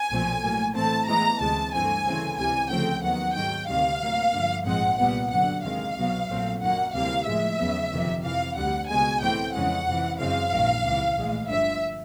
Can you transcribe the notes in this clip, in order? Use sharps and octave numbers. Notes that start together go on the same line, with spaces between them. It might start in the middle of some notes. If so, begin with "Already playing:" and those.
Already playing: G#5
B1 A#2 F3 A3 C4
A2 F#3 A#3
A2 E3 A3 C4 A5
A2 E3 G#3 B3 A#5
D2 C3 E3 G#3 A5
G2 E3 A3 C4 G#5
D2 C#3 E3 A3 C4
C#2 C3 E3 G3 G#5
D2 C#3 F3 A3 C4 G5
D#2 D#3 F#3 B3 F#5
G#2 D#3 F#3 G5
D2 C3 D#3 G3 F5
A2 F#3 A#3
G2 D3 F3
A#1 G#2 F3 G#3 C4 F#5
C2 A#2 G3 B3 F#5
G1 F#2 D3 F#3 F#5
E2 C3 D#3 G#3 F5
C2 B2 F#3 B3
A#1 A#2 F#3 A3 C4
F#2 D#3 F#3 A#3 F#5
D2 C3 E3 G3 A#3 F5
A2 F3 G#3 E5
E2 C#3 F#3 B3
G1 F2 C3 D#3
F2 C3 E3 F5
D2 D3 G3 F#5
C#2 B2 G#3 B3 G#5
A2 E3 A3 C4 G5
F2 C#3 E3 G#3 F#5
F2 C3 E3
F#2 C#3 E3 G#3 C4 F5
A#1 G#2 D#3 F#3
C#2 C3 E3
A#1 A2 E3 G#3
G1 G2 D3 F3 E5